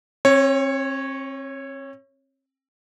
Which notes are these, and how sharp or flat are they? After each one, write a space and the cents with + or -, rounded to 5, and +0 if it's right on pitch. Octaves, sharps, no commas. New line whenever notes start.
C4 +40 C#5 -10